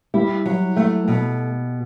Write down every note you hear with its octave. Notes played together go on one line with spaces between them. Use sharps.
G3 E4
F#3
A3
B2